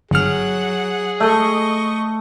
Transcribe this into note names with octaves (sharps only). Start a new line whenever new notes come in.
G1 F#3 G#4 F#5 F6
A3 D#5 C#6